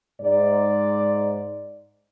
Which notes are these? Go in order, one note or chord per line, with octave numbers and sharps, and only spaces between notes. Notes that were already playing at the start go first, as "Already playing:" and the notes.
G#2 D5